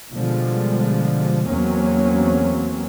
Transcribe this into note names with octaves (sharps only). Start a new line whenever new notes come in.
B2 D3 F3 G3 G#3
E2 F#3 A#3 C4 C#4